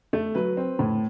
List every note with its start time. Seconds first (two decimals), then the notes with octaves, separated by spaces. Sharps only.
0.13 A3
0.35 F#3 B4
0.57 C4
0.79 A2